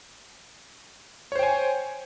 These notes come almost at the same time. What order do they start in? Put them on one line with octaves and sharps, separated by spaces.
C#5 C5 G5 G#5